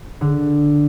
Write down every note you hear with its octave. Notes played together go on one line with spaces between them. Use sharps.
D3